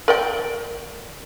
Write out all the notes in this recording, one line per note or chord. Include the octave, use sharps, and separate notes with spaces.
A#4 D5 G5